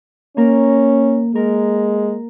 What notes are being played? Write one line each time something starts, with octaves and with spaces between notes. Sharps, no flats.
A#3 C#4 A#4
G#3 A#4